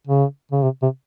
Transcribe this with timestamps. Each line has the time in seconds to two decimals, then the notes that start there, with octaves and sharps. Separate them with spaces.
0.07 C#3
0.52 C#3
0.63 C3
0.82 C3